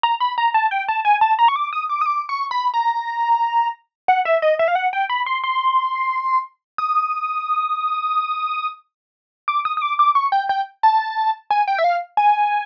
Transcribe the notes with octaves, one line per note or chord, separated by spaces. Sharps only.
A#5
B5
A#5
A5
G5
A5
G#5
A5
A#5
C#6
D6
D#6
D6
D#6
D6
C#6
B5
A#5
F#5
E5
D#5
E5
F5
F#5
G5
B5
C6
C6
D#6
D6
D#6
D#6
D6
D6
C#6
G5
G5
A5
G#5
G5
E5
F5
G#5